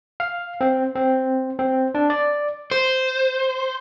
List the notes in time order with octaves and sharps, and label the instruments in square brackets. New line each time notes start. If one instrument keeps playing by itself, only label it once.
[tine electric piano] F5
C4
C4
C4
D4
D5
[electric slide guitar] C5